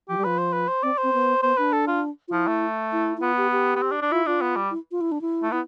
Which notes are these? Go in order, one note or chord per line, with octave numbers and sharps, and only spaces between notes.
F3 G4
G3
F3 B4
C5
B4
C5
C4 D5
C5
C4
B3
B3 C5
D4 B4
A4
F4
F4
F3 E4
A3
E4
E4
B3 F4
G4
G4
B3
C4
D4
D4
E4 F4
D4 F4
B3
G3
E4
F4
E4
D4
E4
A3
B3 E4